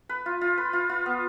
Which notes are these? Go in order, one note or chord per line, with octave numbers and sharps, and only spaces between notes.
B4
F4
F4
B4
F4
F4
B3